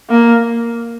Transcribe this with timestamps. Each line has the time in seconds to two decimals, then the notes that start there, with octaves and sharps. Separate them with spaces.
0.10 A#3